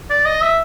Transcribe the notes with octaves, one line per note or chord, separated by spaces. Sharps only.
D5
D#5
E5